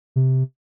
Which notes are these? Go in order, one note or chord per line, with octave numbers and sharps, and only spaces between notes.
C3